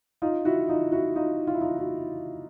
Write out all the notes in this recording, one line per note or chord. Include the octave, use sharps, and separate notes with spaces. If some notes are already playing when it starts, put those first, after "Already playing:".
D#4 F4
E4 F#4
D#4 F4
E4 F#4
D#4 F4
F4
E4
D#4 F4
E4 F#4